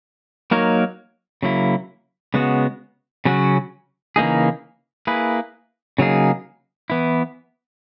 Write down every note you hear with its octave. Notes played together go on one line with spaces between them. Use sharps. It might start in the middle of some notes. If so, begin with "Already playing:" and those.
F#3 A#3 D#4 A#4 C#5
C#3 F#3 A#3 E4
C#3 G#3 B3 F#4
C#3 F#3 C#4 F#4
C#3 E3 A#3 D#4 G#4
A#3 E4 G#4 B4
C#3 F#3 A#3 D#4 G#4
E3 B3 E4